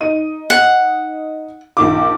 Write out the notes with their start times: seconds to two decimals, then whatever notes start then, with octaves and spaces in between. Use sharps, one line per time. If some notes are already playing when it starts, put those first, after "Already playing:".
0.01 D#4 D#7
0.50 F#5
1.77 A#1 D#3 D6